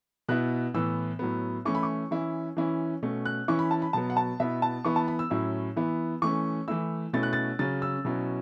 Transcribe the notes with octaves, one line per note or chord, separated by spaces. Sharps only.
B2 B3 E4 F#6
A2 E3 B3 E6
A2 F#3 B3
E3 A3 C#4 E4 C#6
B5
C#6
E3 C#4 E4
E3 C#4 E4
B2 A3 C#4
F#6
E3 C#4 E4 C#6
B5
A5
B5
B2 F#3 B3 A5
F#5
A5
B2 B3 E4 E5
A5
E3 B3 E4 C#6
A5
B5
E6
A2 F#3 C#4 E4
E3 B3 E4
E3 A3 C#4 C#6
E3 A3 E4 E6
B2 A3 C#4 E4 A6
F#6
A6
C#3 F#3 C#4 A6
E6
B2 F#3 C#4 E4